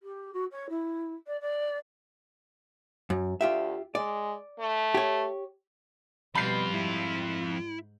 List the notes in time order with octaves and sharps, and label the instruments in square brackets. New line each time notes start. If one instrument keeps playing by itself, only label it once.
[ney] G4
F#4
C#5
E4
D5
D5
[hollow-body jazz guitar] F#2
[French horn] D2 [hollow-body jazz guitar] F4 G4 E5
[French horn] G#3 [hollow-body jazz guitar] D5
[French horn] A3
[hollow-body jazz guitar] G4 C#5
[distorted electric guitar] F2 F4 [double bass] B2 G3 [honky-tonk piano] B5 G6 C7
[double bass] G#2 [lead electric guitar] E4